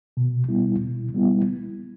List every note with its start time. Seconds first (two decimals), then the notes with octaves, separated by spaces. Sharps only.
0.17 B2
0.49 G3 B3 E4
0.82 B2
1.15 G3 B3 E4